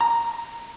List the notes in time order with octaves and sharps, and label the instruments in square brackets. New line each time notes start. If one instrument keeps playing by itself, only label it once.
[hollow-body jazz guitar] A#5